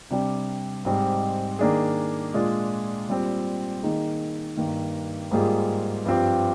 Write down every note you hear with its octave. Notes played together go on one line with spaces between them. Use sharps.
C3 G3 D4 G4
G#2 G3 C4 D#4 G4
D#3 A#3 D4 G#4
A#2 G#3 D4 F4 G#4
A#2 G3 C4
D#3 A#3 D#4 G#4
G2 D#3 A#3
G#2 G3 A#3 F4 G#4
G2 F3 C4 G4